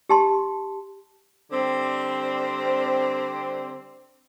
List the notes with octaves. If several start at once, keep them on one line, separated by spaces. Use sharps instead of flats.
G4 A5 C6
D3 G3 C4